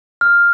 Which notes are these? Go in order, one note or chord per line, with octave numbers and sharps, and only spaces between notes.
F6